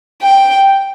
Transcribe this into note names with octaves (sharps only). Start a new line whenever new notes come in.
G5